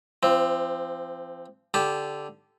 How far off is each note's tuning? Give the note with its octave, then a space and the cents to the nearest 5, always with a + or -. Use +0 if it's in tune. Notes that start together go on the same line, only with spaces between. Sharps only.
F3 -35 C4 +0
D3 +0 G4 +0 A5 -25